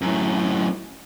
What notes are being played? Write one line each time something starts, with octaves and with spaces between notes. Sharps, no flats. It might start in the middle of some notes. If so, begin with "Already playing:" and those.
F#2 A2